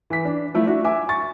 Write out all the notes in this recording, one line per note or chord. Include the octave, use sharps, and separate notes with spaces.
E3 B6
D4
F3 A3 E4
D4 E4 F#4
E5 G#5 D6
C#6 A6